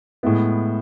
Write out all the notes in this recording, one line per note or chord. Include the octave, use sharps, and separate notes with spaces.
A2 G#3 B3 E4